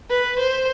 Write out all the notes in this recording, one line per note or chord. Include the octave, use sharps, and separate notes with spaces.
B4
C5